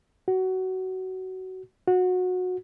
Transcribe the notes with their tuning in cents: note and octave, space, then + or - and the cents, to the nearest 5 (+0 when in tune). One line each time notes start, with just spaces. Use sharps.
F#4 +20
F#4 -20